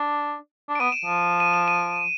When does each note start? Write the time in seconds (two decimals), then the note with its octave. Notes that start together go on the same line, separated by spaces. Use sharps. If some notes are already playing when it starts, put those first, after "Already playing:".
Already playing: D4
0.69 D4
0.75 D7
0.80 B3 D#7
0.92 E7
1.05 F3
1.40 D#7
1.54 E7
1.68 D#7